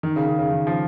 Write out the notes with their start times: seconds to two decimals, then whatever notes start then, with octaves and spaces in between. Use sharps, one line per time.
0.03 D#3
0.16 C#3
0.28 C#3
0.39 C#3
0.51 D#3
0.67 F3